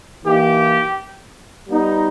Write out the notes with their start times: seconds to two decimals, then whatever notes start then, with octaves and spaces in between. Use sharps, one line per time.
0.24 E3 A#3 D#4 G4
1.67 G3 B3 D#4